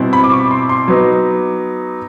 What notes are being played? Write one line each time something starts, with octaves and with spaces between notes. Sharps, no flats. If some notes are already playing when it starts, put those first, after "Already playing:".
Already playing: B2 G3 C4 E4
B5
D6
C#6
C6
C6
F#3 B3 D#4